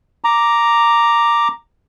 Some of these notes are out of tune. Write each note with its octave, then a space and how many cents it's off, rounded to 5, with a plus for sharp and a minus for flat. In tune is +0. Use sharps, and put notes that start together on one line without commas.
A#5 +0 D6 +0